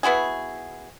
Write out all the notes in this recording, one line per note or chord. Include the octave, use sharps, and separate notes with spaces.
B3 E4 F#4 G#4